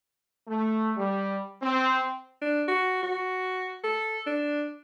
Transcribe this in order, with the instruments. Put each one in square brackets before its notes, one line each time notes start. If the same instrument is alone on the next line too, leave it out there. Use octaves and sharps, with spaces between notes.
[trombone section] A3
G3
C4
[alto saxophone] D4
F#4
F#4
A4
D4